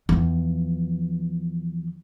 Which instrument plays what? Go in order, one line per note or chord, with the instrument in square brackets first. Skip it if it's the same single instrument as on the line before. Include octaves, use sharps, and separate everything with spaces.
[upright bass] E2 F3